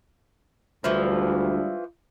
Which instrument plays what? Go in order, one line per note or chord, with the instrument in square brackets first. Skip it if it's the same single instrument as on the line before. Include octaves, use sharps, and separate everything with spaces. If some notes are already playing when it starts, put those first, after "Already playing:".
[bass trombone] D2 [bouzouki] E3 F3 [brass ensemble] G3 G#3 D4